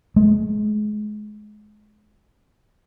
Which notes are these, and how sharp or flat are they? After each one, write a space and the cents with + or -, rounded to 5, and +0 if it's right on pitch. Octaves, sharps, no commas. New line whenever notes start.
G#3 +30